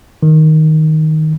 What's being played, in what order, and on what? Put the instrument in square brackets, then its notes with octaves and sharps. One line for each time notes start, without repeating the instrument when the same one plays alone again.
[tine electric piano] D#3